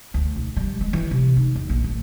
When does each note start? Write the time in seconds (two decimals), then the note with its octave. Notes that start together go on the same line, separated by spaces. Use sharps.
0.14 D2
0.36 B1
0.56 G3
0.81 G#3
0.93 E3
1.11 C3
1.36 D#4
1.55 E2
1.69 A#1
1.84 A2